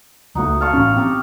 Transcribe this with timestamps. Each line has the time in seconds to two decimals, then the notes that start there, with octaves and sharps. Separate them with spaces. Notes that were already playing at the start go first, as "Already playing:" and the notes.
0.35 C#2 A3 D#4 F#4
0.61 F5 A5 C#6
0.74 A1 C#4
0.97 C4 G4 A#5